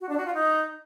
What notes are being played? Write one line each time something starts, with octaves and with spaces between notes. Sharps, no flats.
F#4
D4
F#4
F4
D#4